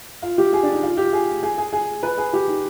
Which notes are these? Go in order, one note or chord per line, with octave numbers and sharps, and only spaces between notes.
F4
G4
G#4
D4
D#4
F4
G4
G#4
G#4
G#4
G#4
B4
G#4
G4
D#4